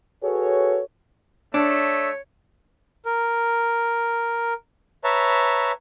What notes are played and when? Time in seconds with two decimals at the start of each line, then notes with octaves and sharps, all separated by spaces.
0.23 F#4 G#4 A4 B4 C#5
1.54 A3 D4 C#5
3.05 A#4
5.04 B4 C#5 E5 A5 A#5